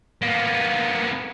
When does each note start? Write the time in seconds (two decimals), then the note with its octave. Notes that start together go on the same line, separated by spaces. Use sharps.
0.22 A#3 B3